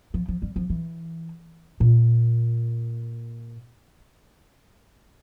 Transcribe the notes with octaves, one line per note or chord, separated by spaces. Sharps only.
F3
F3
G3
F3
E3
A#2